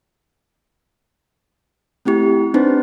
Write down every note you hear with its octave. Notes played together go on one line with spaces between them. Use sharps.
A3 C4 E4 G4
C4 D4 D#4 B4 C5